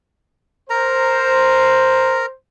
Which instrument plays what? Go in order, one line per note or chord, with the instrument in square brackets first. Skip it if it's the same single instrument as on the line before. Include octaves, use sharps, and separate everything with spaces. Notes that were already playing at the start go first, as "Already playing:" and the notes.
[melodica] A#4 A#5 [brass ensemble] C5